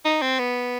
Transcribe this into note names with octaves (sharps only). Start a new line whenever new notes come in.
D#4
C4
B3